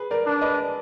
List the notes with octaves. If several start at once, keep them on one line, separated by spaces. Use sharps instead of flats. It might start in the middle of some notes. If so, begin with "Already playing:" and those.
Already playing: G#4 B4
A#4 D5
D4
B4 D#5